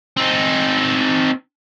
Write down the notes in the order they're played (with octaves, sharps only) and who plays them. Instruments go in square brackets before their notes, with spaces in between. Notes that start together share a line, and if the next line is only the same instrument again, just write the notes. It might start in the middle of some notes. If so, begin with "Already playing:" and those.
[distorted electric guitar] C4 D#4